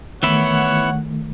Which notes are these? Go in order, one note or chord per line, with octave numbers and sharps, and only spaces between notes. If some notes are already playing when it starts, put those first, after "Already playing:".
D#3 E3 A3 B3 E4 C#5 F#5